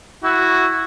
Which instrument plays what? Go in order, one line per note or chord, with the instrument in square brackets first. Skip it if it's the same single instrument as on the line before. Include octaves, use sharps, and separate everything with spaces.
[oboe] E4 [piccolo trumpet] F#4